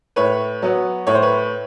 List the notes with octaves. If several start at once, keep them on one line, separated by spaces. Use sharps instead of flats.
A2 B4 C#5
F#3 B3
A2 C#5
C5
B4 C#5